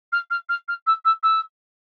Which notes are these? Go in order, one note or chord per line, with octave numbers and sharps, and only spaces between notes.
F6
F6
F6
F6
E6
E6
E6